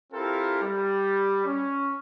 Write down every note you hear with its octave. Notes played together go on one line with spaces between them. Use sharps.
C4 E4 F4 G4 A4 A#4
G3
C#4